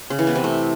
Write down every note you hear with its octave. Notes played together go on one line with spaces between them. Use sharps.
C#3
E3
B3
C3
A3